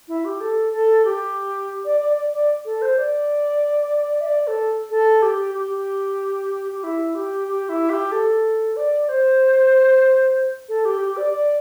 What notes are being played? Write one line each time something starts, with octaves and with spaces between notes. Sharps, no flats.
E4
G4
A4
A4
G4
D5
D5
D5
D5
A4
C5
D5
E5
D5
A4
A4
G4
G4
G4
E4
G4
G4
E4
G4
A4
D5
C5
A4
G4
G4
D5
D5